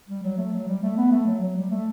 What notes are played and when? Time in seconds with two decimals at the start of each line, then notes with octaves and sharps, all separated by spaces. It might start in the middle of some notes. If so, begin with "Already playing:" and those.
0.08 G3
0.23 F#3
0.37 A3
0.52 F#3
0.68 G3
0.83 A3
0.97 B3
1.11 A3
1.27 F#3
1.42 F#3
1.56 G3
1.71 A3